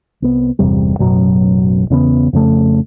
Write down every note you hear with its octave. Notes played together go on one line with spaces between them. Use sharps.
C2 B3
G1 E2 C3 G3
A1 F#2 B2 F#3
E2 C#3 A#3 B3
F2 C#3 A3